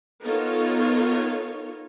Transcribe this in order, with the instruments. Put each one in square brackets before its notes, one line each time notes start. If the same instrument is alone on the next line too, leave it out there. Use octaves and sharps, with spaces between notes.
[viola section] B3 D#4 F4 A4 A#4 C#5